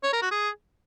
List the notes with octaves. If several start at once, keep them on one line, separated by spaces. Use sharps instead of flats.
C#5
A#4
F#4
G#4